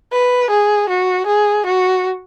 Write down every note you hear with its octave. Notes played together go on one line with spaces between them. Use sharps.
B4
G#4
F#4
G#4
F#4